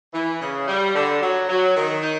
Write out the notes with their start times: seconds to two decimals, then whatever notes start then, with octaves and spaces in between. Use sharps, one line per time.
0.14 E3
0.41 C#3
0.68 G3
0.95 D3
1.22 F#3
1.49 F#3
1.76 D#3
2.03 D#4